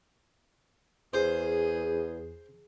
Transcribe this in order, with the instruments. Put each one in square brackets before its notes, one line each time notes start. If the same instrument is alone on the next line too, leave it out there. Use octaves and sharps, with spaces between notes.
[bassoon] E2 [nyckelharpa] G#4 [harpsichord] C5